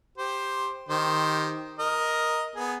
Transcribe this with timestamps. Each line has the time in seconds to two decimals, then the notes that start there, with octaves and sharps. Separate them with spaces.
0.18 G4 C5
0.89 D#3 G4 C5
1.79 A#4 D#5
2.56 B3 G#4